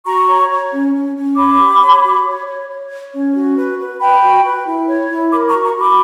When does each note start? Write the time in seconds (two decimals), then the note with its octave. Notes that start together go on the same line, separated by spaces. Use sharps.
0.05 F#4 A#5 C#6
0.27 C#5
0.49 C#5
0.71 C#4
0.94 C#4
1.15 C#4
1.36 C#5 B5 D6
1.58 G4
1.81 C#5
2.03 F#4
2.25 C#5
2.46 C#5
2.68 C#5
2.91 C#5
3.12 C#4
3.34 F#4
3.55 B4
3.78 B4
3.99 B4 G5 B5
4.21 F#4
4.44 B4
4.65 E4
4.87 C#5
5.09 E4
5.31 A#4 B5 D6
5.48 A#5 C#6
5.53 F#4
5.64 A#5 C#6
5.75 F#4
5.80 B5 D6